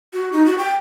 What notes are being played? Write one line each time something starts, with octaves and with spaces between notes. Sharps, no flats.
F#4
D#4
F#4
G5